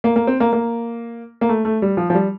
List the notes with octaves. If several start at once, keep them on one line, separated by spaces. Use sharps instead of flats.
A#3
A#3
C4
A#3
A#3
A#3
A3
A3
G3
F3
F3
G3